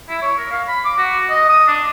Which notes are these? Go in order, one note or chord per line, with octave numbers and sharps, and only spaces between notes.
E4
C#5
A#4
F5
B5
D6
F#4
D#5
D#6
D4